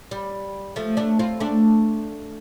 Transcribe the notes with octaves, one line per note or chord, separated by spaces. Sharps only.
G3
F3 A3
A3 D4
C4 F4
A3 D4